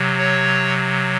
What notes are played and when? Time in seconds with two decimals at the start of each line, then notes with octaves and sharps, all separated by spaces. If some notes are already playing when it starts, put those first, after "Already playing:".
Already playing: C3 F#3
0.18 C#5